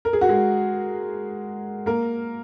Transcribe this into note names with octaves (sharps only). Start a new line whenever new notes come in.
A#4
G#4
F#4
G#3 G#4
A#3 A#4